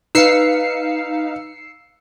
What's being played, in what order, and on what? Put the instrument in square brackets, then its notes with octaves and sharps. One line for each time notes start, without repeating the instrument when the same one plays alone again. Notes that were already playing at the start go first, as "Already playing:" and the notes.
[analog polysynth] D#4 F5 [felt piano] B4 [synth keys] E6 C7 C#7